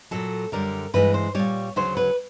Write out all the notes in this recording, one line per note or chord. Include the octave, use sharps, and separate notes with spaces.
A#2 F#3 A4
F#2 D3 G3 A#4
G2 E3 G#3 B4
C5
A#2 G3 C#5
D2 C#3 F#3 C5
B4